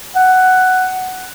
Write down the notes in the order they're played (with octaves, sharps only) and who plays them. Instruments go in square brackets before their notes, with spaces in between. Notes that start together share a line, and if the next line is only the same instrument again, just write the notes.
[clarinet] F#5